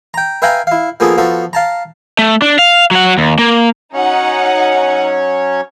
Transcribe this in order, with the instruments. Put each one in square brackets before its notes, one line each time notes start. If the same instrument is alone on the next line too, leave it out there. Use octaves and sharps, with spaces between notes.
[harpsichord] G5 A#5
B4 E5 F5 G5 G#5 A#5
E4 F5
F3 A#3 B3 G#4 A4
F3 B3 F#4 A4
F5 A5 A#5
[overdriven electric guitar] A3
D4
F5
F#3 F#5
D#2
A#3
[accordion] F#3 C#4 C#5 [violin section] D#4 F#5